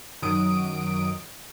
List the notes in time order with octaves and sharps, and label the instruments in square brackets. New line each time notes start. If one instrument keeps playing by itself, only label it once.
[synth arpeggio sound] F#2 D#3 F#3 D#6 D7